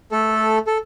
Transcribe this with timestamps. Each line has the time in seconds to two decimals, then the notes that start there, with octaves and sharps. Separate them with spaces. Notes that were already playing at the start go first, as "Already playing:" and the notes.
0.11 A3 A4
0.67 A4